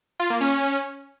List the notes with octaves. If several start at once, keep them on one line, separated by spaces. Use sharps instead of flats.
F4
A#3
C#4